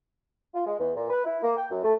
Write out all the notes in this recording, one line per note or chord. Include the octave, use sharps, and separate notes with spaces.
F4
G#3
E2
A#2
B4
E4
A#3
G5
F#2
A3